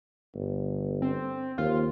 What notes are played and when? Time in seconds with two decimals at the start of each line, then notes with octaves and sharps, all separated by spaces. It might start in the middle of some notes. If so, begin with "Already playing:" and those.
0.34 G1
1.02 C4
1.58 D#2 F4